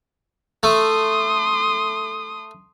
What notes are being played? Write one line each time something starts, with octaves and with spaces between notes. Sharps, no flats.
A3 C6 D#6